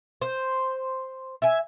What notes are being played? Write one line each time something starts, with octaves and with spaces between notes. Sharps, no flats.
C5
E5 G#5